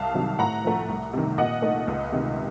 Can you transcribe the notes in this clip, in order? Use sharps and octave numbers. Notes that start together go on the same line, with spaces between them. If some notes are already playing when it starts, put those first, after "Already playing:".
Already playing: C2 F5 A5
C3 D#3 F#3
A2 F#5 A#5
F3 A3
C2
C3 D#3
A#2 D#5 F#5
A3 D#4
C#2
C3 D#3